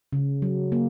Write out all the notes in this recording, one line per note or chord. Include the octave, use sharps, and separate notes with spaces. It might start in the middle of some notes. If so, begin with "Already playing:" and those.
C#3
F#3
A#3